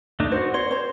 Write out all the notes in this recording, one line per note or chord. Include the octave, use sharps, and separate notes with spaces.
A3 D4 D#4
F#4 C5
C#5 C6
C5 C#5